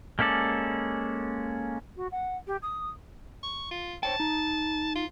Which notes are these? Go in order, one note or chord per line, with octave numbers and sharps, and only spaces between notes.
G#3 A#3 C#4 A4 D5
F#4
F#5
G4
D#6
C#6
F4
C5 C#5 G5 A5
D#4
F4